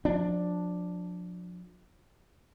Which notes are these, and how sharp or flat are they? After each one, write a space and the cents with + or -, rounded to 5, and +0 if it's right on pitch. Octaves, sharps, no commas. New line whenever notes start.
F3 +35 D4 +0